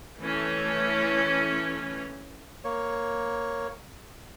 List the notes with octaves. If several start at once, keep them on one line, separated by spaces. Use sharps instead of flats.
E3 A3 C#4
A#3 C#5